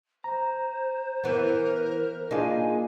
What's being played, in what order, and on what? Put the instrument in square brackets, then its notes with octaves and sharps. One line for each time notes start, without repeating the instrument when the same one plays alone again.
[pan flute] C5 [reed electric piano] A#5
[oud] E3 B3 [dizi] A#4
[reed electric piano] A#3 D4 G#4 [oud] D#4 F4 [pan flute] G#5